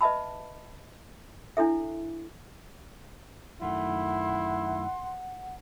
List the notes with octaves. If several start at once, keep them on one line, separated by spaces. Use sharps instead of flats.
B4 D#5 E5 A5 B5
D4 E4 A4 E5
F#2 D#3 A3 E4 F#5 C6